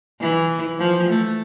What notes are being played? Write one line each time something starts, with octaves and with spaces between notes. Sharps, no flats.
E3
F3
A3